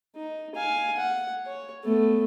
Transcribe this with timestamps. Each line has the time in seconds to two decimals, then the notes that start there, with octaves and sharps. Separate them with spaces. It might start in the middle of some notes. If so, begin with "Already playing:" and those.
0.16 D#4
0.55 F5 G#5
0.96 F#5
1.46 C#5
1.84 A3 B3